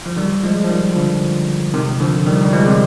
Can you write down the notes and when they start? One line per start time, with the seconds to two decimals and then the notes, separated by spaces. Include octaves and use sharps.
0.06 F3
0.17 D#3 G3
0.44 F3 G#3
0.64 F3
0.70 D#3 G3
0.95 D3 F3
1.74 C3 D#3
2.01 D3 F3
2.26 D#3 G3
2.45 G3
2.53 F3 G#3
2.67 C3